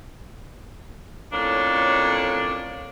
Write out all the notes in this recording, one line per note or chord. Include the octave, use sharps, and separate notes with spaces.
F2 A2 A#3 C#4 D4